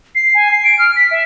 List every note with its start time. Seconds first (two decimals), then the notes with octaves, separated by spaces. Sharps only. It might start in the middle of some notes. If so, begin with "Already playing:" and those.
0.15 C7
0.35 G#5
0.51 C7
0.64 D7
0.79 F6
0.96 B6
1.11 E5